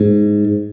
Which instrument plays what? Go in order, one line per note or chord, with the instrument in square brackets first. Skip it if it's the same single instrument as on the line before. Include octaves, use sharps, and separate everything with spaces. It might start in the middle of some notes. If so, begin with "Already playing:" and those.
Already playing: [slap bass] G#2